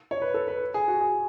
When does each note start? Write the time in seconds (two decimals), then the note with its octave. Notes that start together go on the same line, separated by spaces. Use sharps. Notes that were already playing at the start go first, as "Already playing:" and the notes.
0.11 C#5
0.22 B4
0.34 A4
0.48 B4
0.74 G#4
0.88 F#4
1.01 G#4